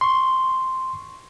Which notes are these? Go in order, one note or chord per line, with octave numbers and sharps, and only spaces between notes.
C6 C#6